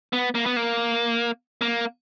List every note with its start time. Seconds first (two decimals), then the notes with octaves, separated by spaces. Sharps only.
0.13 B3
0.35 A#3
0.46 B3
0.56 A#3
1.61 A#3